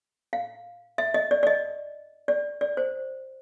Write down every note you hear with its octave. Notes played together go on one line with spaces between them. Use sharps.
F5
E5
D#5
D5
D5
D#5
D5
D5
C5